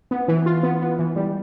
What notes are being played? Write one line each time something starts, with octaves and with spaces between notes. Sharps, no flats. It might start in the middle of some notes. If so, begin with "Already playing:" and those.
B3
E3
F4
B3
B3
E3
G3